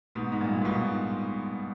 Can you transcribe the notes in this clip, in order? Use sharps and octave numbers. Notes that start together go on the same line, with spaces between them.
G#2 B2
G#2
G2 A#2
A#2
G#2 B2